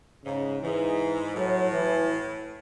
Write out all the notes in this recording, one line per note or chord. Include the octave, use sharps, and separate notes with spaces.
G#2 C#3
G#2 E3
A2 F#3
E3